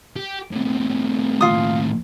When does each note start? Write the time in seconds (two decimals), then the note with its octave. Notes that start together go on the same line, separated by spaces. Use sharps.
0.16 G4
0.52 A2 C3
1.41 D#2 A2 F4 D#6